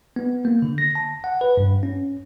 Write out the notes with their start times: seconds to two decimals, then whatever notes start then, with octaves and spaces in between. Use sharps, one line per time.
0.16 B3
0.45 A#3
0.62 D3
0.78 A#6
0.95 A5
1.24 F#5
1.41 B4
1.57 G2
1.83 C#4